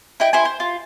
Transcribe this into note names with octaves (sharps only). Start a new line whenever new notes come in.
E4 D#5 G5
E4 C5 G#5
C5
F4